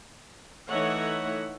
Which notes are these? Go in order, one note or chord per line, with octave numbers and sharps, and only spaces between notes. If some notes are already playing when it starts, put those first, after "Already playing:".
E3 A3 D#4 C#5 E5 F#5